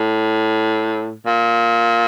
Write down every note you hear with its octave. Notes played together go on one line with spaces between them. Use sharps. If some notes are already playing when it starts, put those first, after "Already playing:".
Already playing: A2
A#2